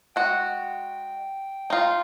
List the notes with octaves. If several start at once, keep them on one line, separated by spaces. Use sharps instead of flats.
G#3 F#4 G5
D#4 F4